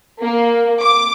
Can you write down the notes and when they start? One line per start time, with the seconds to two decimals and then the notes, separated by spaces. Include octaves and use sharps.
0.21 A#3
0.81 D6